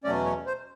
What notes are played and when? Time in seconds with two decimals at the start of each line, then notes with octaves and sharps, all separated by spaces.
0.04 E2 B2 F#3 A3 C#4 D5
0.25 C#5
0.47 C5